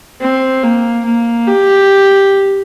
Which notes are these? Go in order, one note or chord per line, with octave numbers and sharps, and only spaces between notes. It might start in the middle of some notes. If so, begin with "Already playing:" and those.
C4
A#3
A#3
G4